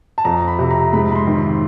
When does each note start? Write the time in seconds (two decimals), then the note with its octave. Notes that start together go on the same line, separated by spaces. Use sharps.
0.18 A5
0.25 F2 A#5
0.48 B5
0.59 C3
0.71 A#5
0.93 G#2 B5
1.12 B5
1.16 C6
1.27 D#3
1.38 C6